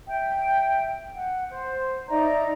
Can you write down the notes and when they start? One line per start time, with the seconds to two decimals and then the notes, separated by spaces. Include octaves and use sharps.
0.08 E5 G5
1.15 F#5
1.49 C5
2.09 D#4 D5 E5 A#5